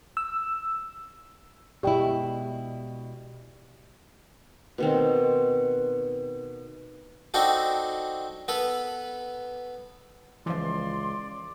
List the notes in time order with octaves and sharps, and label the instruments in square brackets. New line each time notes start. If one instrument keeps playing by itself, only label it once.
[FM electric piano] E6
[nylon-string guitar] B2 G#3 E4 [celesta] G4 D5 G5
[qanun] B2 D#3 C4
[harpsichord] C4 D4 D#4 F#4 A4
B3 A4 B4
[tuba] C#2 [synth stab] E3 F3 [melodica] D5 [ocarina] C6